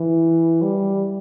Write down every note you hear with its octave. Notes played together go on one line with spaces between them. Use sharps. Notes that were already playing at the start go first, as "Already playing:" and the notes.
Already playing: E3
G3